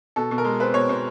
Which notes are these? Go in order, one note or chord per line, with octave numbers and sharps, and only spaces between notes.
B2 A4
B2
A#4
G#3
C4 B4
B2 C#5
B2 C5